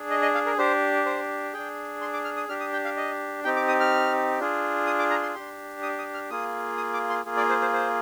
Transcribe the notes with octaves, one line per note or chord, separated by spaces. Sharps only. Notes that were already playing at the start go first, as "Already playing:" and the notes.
Already playing: D4 G#4
D#5
D#5
F5
A#4
D4 G4 C5
C5
D4 G#4 G5
C6
D6
F6
D#6
D4 G4 F6
D#6
G5
F5
D#5
C4 D#4 G4 G5
D6
D#6
F6
D4 F4 G#4
D#6
D6
A#5
C6
D4 G4 C6
D#6
D#6
F6
A#3 F4 G#4 D#6
D#6
D6
C6
A#3 F4 G#4
D5
C5
C5
C5